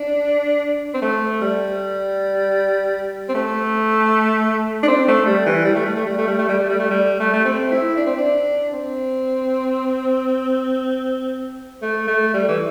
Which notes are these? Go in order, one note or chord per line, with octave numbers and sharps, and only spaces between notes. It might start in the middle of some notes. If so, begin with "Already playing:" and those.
Already playing: D4
C4
A3
G3
C4
A3
D4
C4
A3
G3
E3
G3
A3
G3
A3
G3
A3
G3
A3
G3
A3
G3
A3
G3
A3
A3
C4
E4
D4
C4
D4
C4
A3
A3
G3
E3